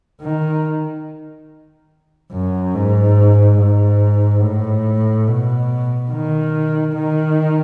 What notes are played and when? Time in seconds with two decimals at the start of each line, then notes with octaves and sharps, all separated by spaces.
0.21 D#3
2.32 F#2
2.75 G#2
3.58 G#2
4.42 A2
5.27 B2
6.11 D#3
6.96 D#3